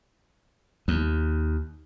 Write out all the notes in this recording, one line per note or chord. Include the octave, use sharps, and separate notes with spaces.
D#2